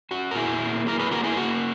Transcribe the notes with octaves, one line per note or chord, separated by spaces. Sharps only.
C#4 F#4
A#4
A#2 E4 G#4
A#3
F#3 A#4
G#4 B4
A#3 F#4 A#4
E4 G#4
A#3 F#4